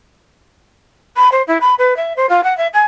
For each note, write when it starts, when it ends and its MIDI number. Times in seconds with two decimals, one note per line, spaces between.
1.16 1.29 83
1.31 1.42 72
1.47 1.57 64
1.60 1.74 83
1.78 1.96 71
1.96 2.13 76
2.16 2.26 72
2.29 2.40 65
2.43 2.55 78
2.57 2.67 76
2.73 2.85 80